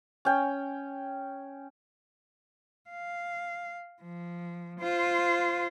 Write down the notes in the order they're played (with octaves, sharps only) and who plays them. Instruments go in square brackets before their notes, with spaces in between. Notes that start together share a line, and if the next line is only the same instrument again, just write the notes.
[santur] C#4 G5
[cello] F5
F3
F4 C5